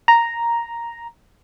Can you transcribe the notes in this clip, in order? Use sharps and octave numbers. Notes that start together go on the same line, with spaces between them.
A#5